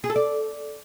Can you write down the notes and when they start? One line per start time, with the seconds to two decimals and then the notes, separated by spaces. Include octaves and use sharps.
0.04 G#4
0.10 A4
0.16 D5